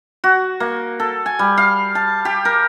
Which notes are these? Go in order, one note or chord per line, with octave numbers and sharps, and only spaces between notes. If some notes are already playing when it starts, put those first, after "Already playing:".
F#4
A#3
A4
G#5
G3
F5
A5
G4
A#4